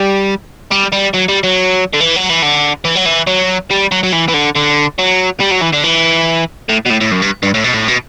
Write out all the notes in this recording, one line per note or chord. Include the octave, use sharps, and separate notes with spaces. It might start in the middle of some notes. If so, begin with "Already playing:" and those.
Already playing: G3
G3
G3
F#3
G3
F#3
D3
E3
F#3
E3
D3
E3
F#3
E3
F#3
G3
F#3
F#3
E3
E3
D3
D3
F#3
G3
F#3
E3
D3
E3
A2
B2
A2
A2
F#2
G2
G2
A2
B2
A2
B2